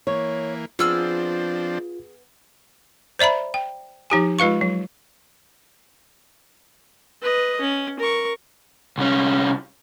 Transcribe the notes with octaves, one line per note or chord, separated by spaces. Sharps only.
E3 A#3 C#5
F3 B3 C4 D4 F4 G#4 E6 F6
C5 D5 E5 A#5 B5
G5
F3 D#4 G4 G#5
G#3 F4 B4 F5 C#6
F#3
B4 D#5
C#4
A#4 C#6
C2 C#4